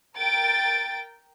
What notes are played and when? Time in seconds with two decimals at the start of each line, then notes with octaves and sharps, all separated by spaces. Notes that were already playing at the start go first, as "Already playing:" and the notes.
0.16 A#4 G5 A6 D7